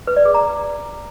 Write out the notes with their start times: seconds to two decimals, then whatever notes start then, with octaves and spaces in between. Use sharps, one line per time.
0.07 B4
0.16 D5
0.25 G#4
0.34 A#5